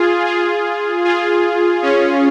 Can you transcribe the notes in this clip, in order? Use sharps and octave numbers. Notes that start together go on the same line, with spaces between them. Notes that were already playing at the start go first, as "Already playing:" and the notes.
Already playing: F4 G#4
F4 G#4
F4 G#4
C#4